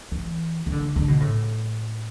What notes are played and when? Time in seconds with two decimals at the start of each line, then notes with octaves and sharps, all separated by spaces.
0.11 E3
0.66 E3
0.72 D3
0.96 D3
1.08 B2
1.20 A2